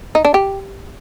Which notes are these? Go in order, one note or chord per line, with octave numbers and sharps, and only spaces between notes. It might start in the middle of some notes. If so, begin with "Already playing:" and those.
D#4
D4
G4